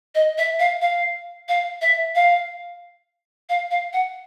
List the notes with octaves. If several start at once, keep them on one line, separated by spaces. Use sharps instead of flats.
D#5
E5
F5
F5
F5
E5
F5
F5
F5
F#5